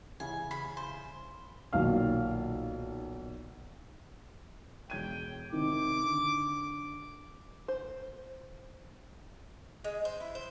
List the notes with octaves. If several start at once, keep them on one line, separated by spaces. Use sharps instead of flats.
C#3 E3 G#5
B5
C5
B1 A#2 D#3 F5 F6
E1 G5 G#6 D#7
C3 D#3 D6
D3
C5
G#3
C5
E4
C5